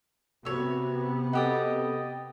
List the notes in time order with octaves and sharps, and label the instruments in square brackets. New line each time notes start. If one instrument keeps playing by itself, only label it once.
[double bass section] C3 B3 [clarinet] F#4 [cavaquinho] C#5 E5
[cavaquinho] F#4 G4 D#6 [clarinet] A4 [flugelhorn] D#5